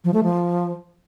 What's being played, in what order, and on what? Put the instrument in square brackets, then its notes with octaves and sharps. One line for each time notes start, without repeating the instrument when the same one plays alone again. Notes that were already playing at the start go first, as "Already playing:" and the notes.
[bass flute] F3
A3
F3